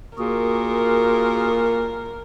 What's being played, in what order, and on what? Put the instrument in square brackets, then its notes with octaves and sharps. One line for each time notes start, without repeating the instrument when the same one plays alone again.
[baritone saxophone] A#2 [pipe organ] F#4 G#4 [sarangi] A#4